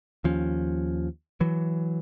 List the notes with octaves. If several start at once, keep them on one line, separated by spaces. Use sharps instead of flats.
D#2 F3 C#4
E3 F#3